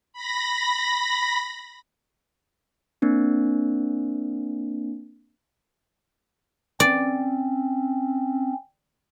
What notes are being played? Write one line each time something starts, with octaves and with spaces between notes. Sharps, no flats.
B5 A#6
A#3 C4 D4
C4 C#4 D5